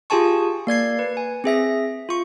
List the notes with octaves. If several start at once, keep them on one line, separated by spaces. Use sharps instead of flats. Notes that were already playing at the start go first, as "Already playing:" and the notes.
F4 G4 G#4 G#5 A5 C#6
A#3 D5 G#6 C7
B4
G#5
C4 G#4 E5 A#6
F4 C#6